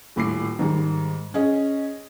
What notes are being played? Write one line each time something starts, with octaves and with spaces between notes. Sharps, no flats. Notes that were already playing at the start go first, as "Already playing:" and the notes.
D#1 A2 D6 C7
G#2 D#3 G3
C#4 G#4 D#5